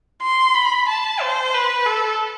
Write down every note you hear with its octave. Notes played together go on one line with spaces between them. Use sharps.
C6
B5
A5
C5
B4
A4